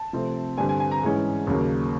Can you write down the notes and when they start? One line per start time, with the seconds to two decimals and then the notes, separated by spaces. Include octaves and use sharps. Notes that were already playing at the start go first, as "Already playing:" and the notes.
Already playing: A5
0.13 C3 F3 A3 C4
0.58 G2 D3 G3 C4 G#5
0.69 G#5
0.80 G#5
0.91 A#5
1.03 G#2 E3 G#3 C#4
1.47 D#2 C#3 F#3 A#3